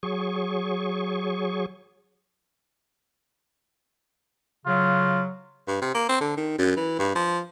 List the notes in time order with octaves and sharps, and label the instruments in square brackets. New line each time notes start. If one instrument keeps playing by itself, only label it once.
[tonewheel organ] F#3 G#4 C#6
[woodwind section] C#3 F#3 [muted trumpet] F4
[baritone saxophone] G2
C3
A#3
C4
D3
D#3
F#2
E3
G2
F3